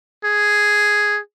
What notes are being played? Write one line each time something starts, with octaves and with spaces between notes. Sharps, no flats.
G#4